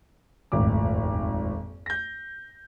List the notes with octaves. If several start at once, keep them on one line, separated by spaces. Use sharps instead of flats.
D#1 G#1 F2 A2 D6
G6 A#6